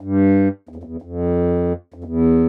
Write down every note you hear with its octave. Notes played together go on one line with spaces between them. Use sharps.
G2
E2
F2
E2
F2
F2
E2